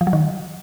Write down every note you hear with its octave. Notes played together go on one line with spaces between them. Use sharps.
F3
F#3
D#3